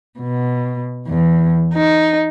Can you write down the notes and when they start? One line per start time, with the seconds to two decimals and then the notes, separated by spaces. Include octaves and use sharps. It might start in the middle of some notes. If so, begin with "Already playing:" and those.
0.19 B2
1.08 E2
1.74 D#4